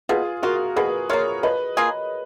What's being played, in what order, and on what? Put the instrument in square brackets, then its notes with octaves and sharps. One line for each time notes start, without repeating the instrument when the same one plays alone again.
[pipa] B2 [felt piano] F4 G#4
[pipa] A#3 F4 [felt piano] F#4 A#4
[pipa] B2 [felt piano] G#4 B4
[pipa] A#3 F4 [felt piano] A#4 C#5
[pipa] F3 [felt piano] B4 D#5
[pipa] A#3 F4 G#4